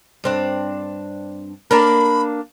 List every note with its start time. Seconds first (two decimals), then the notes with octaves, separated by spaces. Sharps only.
0.24 G2 C4 D4
1.71 A#3 D4 A#4 B5